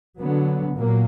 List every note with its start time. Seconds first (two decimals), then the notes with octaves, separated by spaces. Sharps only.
0.19 D3 F#3 B3
0.73 A#2 F#3 A#3